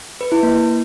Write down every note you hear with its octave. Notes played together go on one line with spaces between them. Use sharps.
B4
E4
A#3